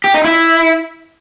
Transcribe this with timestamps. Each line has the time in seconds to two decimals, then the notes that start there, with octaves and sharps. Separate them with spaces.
0.04 G4
0.14 D#4
0.24 E4